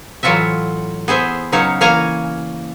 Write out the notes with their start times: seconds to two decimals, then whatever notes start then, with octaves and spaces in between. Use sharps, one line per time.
0.23 A2 E3 F#3 F4 F#4 E5
1.08 B3 G#4 C5 E5
1.52 C#3 F#3 D#4 C#5 F5
1.81 E3 A#3 C#5 F5 G#5 A#5